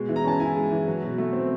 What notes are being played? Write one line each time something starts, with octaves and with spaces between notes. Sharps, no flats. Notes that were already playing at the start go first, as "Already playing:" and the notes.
Already playing: B2 G#3
E3
A#5
C#4 A5
E4 G#5
G#3
E3
F#3
B2
A3
C4